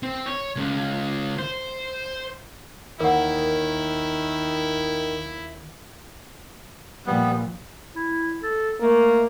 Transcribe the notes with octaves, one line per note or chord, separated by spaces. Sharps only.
C4
C#5
C#2
C5
D#2 D#3 E4 A#4 F#5
A#2 F3 G3 B3
E4
A4
A3 A#3